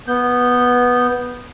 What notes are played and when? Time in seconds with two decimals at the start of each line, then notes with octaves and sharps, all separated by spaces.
0.08 B3 G6